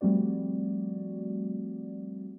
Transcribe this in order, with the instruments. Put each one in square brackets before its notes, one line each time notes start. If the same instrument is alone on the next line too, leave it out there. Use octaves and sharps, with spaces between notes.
[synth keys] F3 G3 A3 C4 F#4 D5